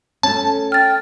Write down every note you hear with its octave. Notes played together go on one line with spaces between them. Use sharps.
A3 C#4 A5
G5 F6 A6